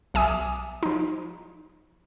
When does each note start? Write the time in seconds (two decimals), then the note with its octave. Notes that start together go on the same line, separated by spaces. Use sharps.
0.14 B1 E5 G#5 D6 D#6
0.83 F3 D#4